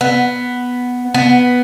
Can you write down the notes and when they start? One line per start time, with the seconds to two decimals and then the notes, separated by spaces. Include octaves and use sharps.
0.01 B3
1.14 B3